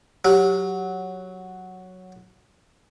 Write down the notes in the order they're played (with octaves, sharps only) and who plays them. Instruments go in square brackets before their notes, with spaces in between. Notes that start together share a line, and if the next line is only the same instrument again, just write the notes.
[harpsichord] F#3 [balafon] G4